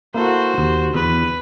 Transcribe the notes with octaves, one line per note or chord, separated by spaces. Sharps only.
A#3 E4 F#4 A4 C5
D#2
E2 B4